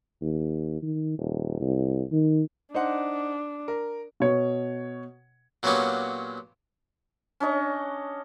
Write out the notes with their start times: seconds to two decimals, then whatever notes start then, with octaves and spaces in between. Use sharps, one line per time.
0.22 D#2
0.82 D#3
1.18 D#1
1.61 C2
2.12 D#3
2.74 D4 D#4 C5 F#5
3.68 A#4
4.20 B2 C#5
5.63 A#2 F#3 A#3 B3 C#4 G4
7.40 C#4 D4 D#5 C#6